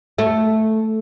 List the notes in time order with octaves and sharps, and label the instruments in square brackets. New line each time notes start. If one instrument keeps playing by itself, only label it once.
[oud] A3